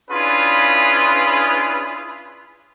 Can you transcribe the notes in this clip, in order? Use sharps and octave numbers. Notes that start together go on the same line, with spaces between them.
C#4 D4 E4 F4 G#4 B4